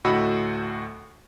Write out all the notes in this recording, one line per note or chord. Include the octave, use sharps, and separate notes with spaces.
D2 A2 F#4 D#5 B5 E6